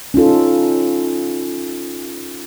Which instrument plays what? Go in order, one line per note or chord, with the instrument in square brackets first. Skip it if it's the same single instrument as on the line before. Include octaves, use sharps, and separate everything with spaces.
[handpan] C#4 D#4 F4 A4